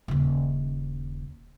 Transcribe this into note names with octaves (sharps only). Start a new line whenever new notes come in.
D#1 C#3